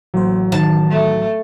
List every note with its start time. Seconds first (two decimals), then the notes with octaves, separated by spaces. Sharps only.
0.14 A1 F#3 A#3 C5
0.52 D#3 C#5 A5
0.90 A3